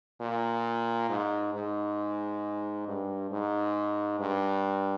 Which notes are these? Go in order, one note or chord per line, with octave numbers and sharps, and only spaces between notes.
A#2
G#2
G#2
G2
G#2
G2